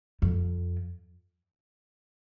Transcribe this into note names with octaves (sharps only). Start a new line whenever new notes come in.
F2